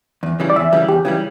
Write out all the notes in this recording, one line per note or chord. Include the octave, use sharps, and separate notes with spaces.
E2
C#3 E3 G3
D5
E2 E5
C#3 E3 G3
E2 G4
C#3 E3 G3